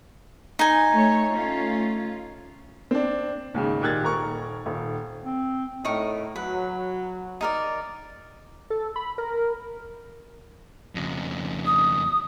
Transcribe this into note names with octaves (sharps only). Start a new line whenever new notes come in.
D#4 G#5
A3 C#5
A3 C#4 F4
C4 D4
D#2 G#2 C#3
A#2 D#3 G4 F#6 G#6 A6
D#1 A#4 C#6
D#1
C4
A2 D#4 A#4 C#6
F#3 B4
D#4 A#4 D5
A4
B5
A#4
F2 C#3
D#6